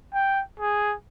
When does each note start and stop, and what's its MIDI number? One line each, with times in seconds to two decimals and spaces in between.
0.14 0.42 79
0.59 0.95 68